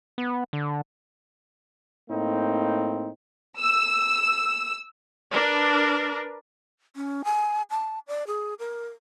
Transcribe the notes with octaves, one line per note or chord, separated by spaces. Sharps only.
B3
D3
A2 A#3 C4 D#4
E6
D4 A#4 B4
C#4
G#5
A5
D5
G#4
A#4